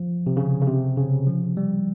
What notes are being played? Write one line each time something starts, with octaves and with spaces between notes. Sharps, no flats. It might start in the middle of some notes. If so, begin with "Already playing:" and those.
Already playing: F3
C3
C#3
C#3
C3
C#3
F3
G3